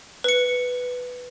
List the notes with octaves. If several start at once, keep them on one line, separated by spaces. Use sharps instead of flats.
B4 C#7